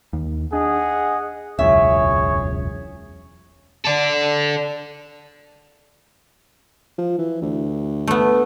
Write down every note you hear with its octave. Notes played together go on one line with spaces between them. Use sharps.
D#2
D4 G#4 D#5 F#5
E1 C#2 F#2 G#4 C#5 E5
A4 D5
F3
E3
D2
A3 B3